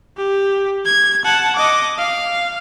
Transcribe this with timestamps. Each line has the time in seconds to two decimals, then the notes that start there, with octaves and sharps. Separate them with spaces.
0.18 G4
0.86 G#6
1.24 F#5 A5
1.56 D#5 D6
1.98 F5